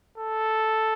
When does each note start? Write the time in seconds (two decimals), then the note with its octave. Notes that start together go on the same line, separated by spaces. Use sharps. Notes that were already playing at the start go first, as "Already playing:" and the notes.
0.18 A4